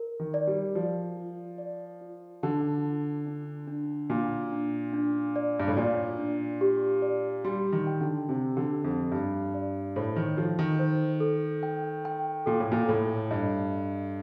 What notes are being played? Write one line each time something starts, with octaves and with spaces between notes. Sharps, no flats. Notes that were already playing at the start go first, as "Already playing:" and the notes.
Already playing: A#4
D#3
D5
G3
F3 D5
F4
D5
F4
D3 A5
F4
D4
D4
A#2 D4
D4
D4
D5
G2
A2
A#2 D5
D4
G4
D5
G3 C6
D#3
G5
D3
C3 G4
D3
G4
F2
G2 G4
D5
A2 C5
D#3
F3 A4
D#3
C5
A4
G5
G5
A#2 A4
A2
A#2
A2 A4
G2 D#5
D#5